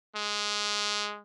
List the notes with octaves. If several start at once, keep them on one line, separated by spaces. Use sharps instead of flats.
G#3